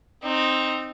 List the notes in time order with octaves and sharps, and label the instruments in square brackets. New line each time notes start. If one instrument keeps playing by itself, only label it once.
[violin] C4 D#4